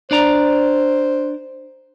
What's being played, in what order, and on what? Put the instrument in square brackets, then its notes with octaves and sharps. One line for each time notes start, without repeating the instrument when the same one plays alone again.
[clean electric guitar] D4 D5 A#5 [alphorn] C5